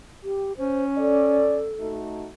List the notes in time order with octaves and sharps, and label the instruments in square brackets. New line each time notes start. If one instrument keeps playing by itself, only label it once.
[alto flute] G4
[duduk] C#4 [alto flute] C5
[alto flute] A4 [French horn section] D5
[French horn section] A3 D#4 F#4